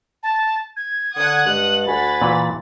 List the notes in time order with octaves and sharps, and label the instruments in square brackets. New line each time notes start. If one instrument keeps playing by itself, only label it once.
[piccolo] A5
G#6
[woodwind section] D3 [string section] F#5 D#6 F#6
[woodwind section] G2 G#3 [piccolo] F#7
[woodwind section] D2 F#5 G#5 [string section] F#4 A6 [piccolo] B5
[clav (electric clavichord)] A#2 E3